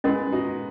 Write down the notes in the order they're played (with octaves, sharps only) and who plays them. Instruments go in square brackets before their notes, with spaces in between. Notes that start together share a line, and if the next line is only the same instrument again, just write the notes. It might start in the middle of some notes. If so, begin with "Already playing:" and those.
[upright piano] G#3 B3 [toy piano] C#4 E4 A#4 D#5
[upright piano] D#4 F#4